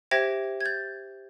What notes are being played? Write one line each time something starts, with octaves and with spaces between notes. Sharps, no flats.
G4 C5 E5 G5 G#6 A#6
G#6
G6 A6